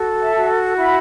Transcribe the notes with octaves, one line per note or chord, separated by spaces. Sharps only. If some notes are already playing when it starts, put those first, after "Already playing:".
Already playing: F#4 A4
E5 A5
F#4
E4 F#5 B5